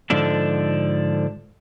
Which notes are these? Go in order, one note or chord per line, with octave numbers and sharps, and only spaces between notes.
G#2 D3 F3 D4 A4